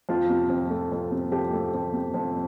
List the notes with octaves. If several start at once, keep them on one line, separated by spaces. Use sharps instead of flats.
F2 F4
C3
F2
A3
F2
C3
F2 G4
A3
F2
C3
F2